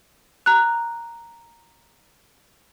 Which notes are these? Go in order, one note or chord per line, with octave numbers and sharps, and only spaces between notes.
A#5 F#6